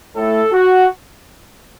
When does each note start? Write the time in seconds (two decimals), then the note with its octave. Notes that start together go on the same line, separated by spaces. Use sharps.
0.15 A2 A3 A4
0.52 F#4